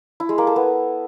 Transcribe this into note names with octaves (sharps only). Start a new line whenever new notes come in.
E4
G#3
A#3
A4
B3